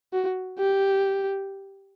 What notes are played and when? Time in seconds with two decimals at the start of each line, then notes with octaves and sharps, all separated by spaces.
0.13 F#4
0.59 G4